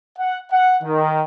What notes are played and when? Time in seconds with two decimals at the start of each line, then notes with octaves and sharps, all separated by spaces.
0.18 F#5
0.51 F#5
0.83 D#3